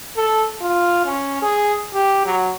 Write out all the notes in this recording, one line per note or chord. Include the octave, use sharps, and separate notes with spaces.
A4
F4
C#4
G#4
G4
F#3